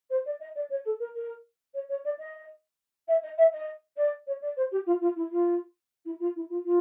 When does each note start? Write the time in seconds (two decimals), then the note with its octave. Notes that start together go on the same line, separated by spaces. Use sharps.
0.10 C5
0.25 D5
0.40 D#5
0.55 D5
0.70 C#5
0.85 A4
0.99 A#4
1.15 A#4
1.74 C#5
1.89 C#5
2.04 D5
2.18 D#5
3.08 E5
3.23 D#5
3.38 E5
3.52 D#5
3.96 D5
4.27 C#5
4.41 D5
4.56 C5
4.71 G4
4.86 F4
5.01 F4
5.16 E4
5.31 F4
6.05 E4
6.20 F4
6.35 E4
6.50 F4
6.65 F4